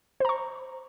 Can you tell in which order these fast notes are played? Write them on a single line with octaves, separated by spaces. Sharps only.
C5 A#5 C#6